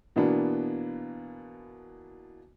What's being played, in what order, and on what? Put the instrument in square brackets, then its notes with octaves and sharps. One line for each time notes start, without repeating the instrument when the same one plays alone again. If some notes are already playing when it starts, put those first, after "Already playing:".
[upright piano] B2 E3 A#3 B3 D4